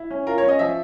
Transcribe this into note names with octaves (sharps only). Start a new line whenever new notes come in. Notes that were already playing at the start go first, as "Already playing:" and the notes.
Already playing: E4
C#4
F4 A#4
C#5
C#4
D#5
F3 E5